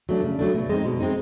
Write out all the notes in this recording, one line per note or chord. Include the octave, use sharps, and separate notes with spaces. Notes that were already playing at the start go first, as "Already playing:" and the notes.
F#3 A3 D4
C#3
F#3 A3 D4
B2
G#3 C4 D#4
B2
G#3 C4 D#4